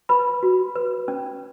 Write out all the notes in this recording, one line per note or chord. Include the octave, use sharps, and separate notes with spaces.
B4 B5
F#4
B4
C#4